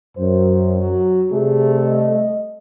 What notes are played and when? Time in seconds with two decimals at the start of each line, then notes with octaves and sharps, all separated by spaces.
0.17 F#2 C5
0.79 F#3
1.32 C3 G3 A3 G#4
1.86 D#5